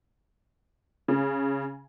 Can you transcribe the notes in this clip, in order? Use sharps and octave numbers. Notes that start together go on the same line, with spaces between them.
C#3